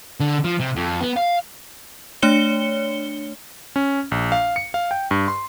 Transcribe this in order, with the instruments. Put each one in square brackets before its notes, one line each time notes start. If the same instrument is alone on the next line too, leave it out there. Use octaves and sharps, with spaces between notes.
[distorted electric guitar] D3
F3
C3
F2
B3
F5
[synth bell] A3 D4 C#5 C#7 G7
[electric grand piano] C#4
A#1
F5
C#7
F5
G5
G2
C6